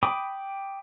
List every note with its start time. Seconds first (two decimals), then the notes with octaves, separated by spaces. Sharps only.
0.03 G5 B5 D6 D#6